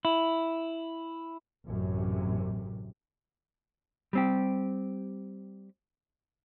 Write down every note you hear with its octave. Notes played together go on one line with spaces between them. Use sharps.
E4
A1 F#2 C3
G3 C4 G4